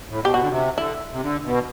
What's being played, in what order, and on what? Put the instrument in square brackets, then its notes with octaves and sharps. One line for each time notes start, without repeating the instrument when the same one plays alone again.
[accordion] A2
[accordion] B2 [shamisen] G4
[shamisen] F#4
[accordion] D3
C3
[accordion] D3 [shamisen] E4
[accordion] C3
D3
B2